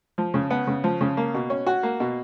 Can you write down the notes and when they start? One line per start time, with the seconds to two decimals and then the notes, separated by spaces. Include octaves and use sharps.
0.18 F3
0.34 C#3
0.50 B3
0.67 C#3
0.84 F3
1.01 C#3
1.17 A#3
1.34 B2
1.50 C#4
1.67 F#4
1.83 A#3
2.00 B2